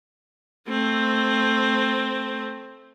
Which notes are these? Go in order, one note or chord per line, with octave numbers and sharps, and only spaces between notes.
A3 C4